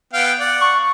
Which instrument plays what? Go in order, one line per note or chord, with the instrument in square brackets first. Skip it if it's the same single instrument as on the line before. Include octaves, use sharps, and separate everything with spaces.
[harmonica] B3 F5 G5
D5 F#5
[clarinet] C#6